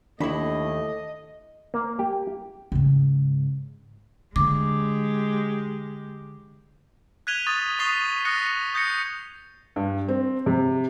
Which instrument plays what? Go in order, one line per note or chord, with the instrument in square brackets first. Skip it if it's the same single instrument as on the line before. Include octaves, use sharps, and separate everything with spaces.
[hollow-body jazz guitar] D#2 E4 [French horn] A3 [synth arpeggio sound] D4 B5 [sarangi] D#5
[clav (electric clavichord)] A#3
G4
[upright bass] G#2 C#3
[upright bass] D3 [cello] G#3 G4 [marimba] D6
[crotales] F#6 G#6 B6 D#7 F7 G7
C#6 D#6 A6
C#6 D#6 B6 C7 F7 G7
D#6 F#6 A#6 B6 C#7
D#6 G6 A#6 C#7
[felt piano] G2
C4
C3